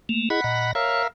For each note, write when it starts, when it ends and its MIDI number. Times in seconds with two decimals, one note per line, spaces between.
0.09 0.29 57
0.09 0.29 58
0.30 0.41 64
0.30 0.41 68
0.30 0.41 75
0.30 0.71 78
0.30 0.71 83
0.44 0.73 46
0.44 0.73 75
0.44 0.73 82
0.75 1.07 70
0.75 1.02 73
0.75 1.07 76
0.75 1.07 77